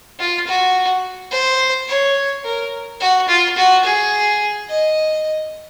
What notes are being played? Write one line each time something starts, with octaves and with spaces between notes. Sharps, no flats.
F4
F#4
C5
C#5
A#4
F#4
F4
F#4
G#4
D#5